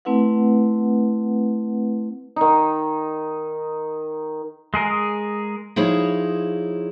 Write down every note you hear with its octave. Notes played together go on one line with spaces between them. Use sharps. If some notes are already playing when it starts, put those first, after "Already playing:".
A3 C4 E4 B4 F#5
D#3 D#4
G#3 G#4 A#4
F3 D#4 E4 G#4 C#5